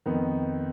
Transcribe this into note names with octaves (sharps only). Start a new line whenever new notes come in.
F2 D#3 B3